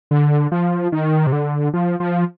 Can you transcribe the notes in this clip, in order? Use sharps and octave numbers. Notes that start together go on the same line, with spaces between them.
D3
F3
D#3
C3
D3
F3
F3